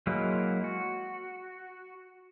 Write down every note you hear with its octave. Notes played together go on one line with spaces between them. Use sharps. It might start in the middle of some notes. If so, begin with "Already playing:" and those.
F#3 G#3 A#3 E4
F#4